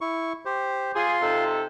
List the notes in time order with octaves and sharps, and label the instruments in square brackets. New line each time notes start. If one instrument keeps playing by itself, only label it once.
[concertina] E4 C#6
G4 C5
[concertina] F4 C6 [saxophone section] G#4
[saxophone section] C3 D#4 A4